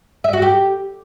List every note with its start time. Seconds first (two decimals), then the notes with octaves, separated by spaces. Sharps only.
0.24 E5
0.33 F#4
0.42 G4